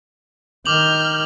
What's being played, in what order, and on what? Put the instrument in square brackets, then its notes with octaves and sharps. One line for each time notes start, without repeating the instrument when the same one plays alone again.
[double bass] D#3 [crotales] D6 F7 F#7 [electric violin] F6 G6